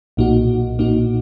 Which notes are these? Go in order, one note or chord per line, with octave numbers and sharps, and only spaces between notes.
B1 A#2 A#3 D#4 F#4
B1 A#2 A#3 D#4 F#4